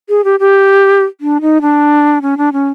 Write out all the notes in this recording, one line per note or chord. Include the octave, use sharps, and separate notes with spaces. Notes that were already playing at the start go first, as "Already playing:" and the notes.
G#4
G4
G4
D4
D#4
D4
C#4
D4
C#4